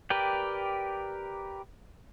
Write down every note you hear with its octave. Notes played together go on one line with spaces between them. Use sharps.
G4 A#4 B4 D5 G5